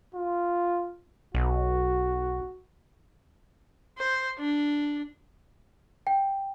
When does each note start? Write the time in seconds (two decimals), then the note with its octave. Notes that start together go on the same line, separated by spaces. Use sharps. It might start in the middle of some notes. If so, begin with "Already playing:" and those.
0.14 F4
1.35 B1 F#4
3.98 C5
4.39 D4
6.07 G5